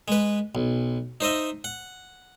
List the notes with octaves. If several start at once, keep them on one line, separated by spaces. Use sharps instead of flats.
G#3 B4
B1
D#4 C5 D#5 E5
F#5